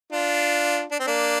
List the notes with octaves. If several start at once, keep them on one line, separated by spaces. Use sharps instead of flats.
D4 F4
D4
C4
A#3 D4